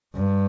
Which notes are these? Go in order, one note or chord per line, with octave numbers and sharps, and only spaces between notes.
G2